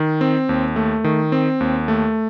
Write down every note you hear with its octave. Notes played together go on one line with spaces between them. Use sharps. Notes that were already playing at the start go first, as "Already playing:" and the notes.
Already playing: D#3
C4
D#2
A3
D#3
C4
D#2
A3